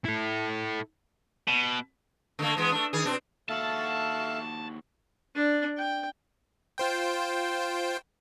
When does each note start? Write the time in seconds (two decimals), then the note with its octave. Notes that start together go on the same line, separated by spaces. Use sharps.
0.05 E4 A4
1.48 B2
2.39 D3 A3 A#3
2.57 E3 G#3 B3
2.72 A3 D4
2.93 D#3 G#4
3.05 B2 C4 D4
3.49 D#2 F#4 A4 E5 F5 A5
5.35 D4
5.77 G5
6.78 F4 C5 G5